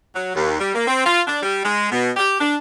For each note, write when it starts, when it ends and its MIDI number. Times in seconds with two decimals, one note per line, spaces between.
0.15 0.34 54
0.35 0.59 39
0.60 0.73 55
0.75 0.86 58
0.87 1.03 60
1.05 1.22 65
1.27 1.41 62
1.43 1.64 55
1.64 1.88 56
1.92 2.11 47
2.17 2.39 67
2.40 2.56 62